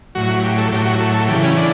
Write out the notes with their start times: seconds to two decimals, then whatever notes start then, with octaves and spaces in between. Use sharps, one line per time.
0.15 A2 F#3 F#4
0.43 G4
0.58 A4
0.72 A2 F#3 G4
0.86 F#4
1.00 A4
1.14 A4
1.28 C#3 E3 G4
1.43 C#4
1.57 D4